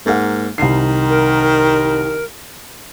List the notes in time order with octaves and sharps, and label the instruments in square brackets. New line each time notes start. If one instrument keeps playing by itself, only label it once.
[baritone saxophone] G#2 [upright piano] A#3 A#4 F#5
[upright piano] C2 C7 [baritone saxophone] D#3
[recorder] A#4